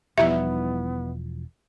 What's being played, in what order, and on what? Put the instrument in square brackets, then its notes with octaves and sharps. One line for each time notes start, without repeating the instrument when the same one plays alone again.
[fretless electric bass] E1 F3 [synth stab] G3 D#4 E4 [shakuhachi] B3 [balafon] E5